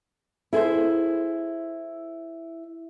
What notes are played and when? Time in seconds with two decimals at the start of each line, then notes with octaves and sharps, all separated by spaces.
0.53 E4 G#4 A4 C5